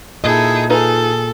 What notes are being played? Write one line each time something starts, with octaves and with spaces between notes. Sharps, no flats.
A#2 D#4 E4 G#4 A4 D#5
D#4 F4 G#4 A4 B4